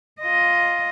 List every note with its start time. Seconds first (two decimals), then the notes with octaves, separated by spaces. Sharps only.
0.21 F4 D#5